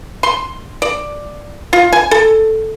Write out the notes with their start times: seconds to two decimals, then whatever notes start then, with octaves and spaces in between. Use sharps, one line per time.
0.23 C6
0.82 D5
1.73 F4
1.92 G#5
2.11 A4